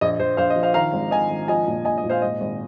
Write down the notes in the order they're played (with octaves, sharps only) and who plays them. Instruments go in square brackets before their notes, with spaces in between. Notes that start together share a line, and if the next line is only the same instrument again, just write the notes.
[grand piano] A#1 D#5
A#1 C5
A#1 C5 F5
D#5
F3
C5 F5
D#3 F5 A#5
G#1
D#3 D#5 G#5
G#1
F3 D#5 G#5
A#2
A#1 D#5 G#5
D#5
A#2
C5 F5
G#2 D#5
G#1